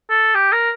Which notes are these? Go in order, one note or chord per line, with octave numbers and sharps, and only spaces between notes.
A4
G4
A#4